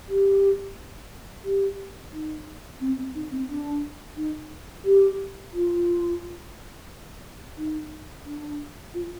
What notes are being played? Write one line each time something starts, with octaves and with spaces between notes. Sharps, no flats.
G4
G4
D#4
C4
C4
D#4
C4
D4
D#4
G4
F4
D#4
D4
F4